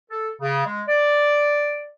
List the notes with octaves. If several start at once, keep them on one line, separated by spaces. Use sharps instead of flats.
A4
C#3
G#3
D5